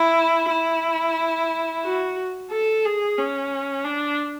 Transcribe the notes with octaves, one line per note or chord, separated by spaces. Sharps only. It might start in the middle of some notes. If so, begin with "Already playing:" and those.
Already playing: E4
E4
F#4
A4
G#4
C#4
D4